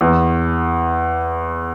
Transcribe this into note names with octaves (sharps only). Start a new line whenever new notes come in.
E2